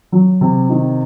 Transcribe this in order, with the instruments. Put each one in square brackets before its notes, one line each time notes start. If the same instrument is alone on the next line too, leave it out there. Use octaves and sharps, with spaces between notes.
[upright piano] F#3
C3
D#3